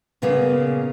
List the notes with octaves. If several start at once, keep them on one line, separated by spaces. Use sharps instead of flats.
A#2 C#3 A#3 B3